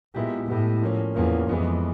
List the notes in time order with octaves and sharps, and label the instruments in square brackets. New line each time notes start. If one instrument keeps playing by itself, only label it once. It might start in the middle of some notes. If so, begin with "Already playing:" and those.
[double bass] A#2 [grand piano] G#3 B3 E4 G4
[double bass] A2 [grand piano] G#3 B3 E4 G4
[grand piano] A#2 F3 A#3 C#4
[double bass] E2 [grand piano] A#2 F3 A#3 C#4
[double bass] F2 [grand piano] E3 G#3 B3